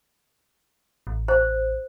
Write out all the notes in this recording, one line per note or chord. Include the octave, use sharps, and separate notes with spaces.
A1
C5